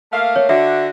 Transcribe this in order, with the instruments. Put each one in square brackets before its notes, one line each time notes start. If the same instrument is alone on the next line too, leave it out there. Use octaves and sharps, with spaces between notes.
[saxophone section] A3 A#3 F5
[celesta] C#5
[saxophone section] D3 D4 F#4 [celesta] E5